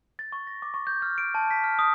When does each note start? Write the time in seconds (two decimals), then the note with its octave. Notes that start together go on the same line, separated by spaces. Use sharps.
0.19 A6
0.32 C#6
0.47 A#6
0.62 D6
0.74 C#6
0.87 G6
1.02 F6
1.18 D7
1.35 A5
1.51 B6
1.64 F6
1.79 D#6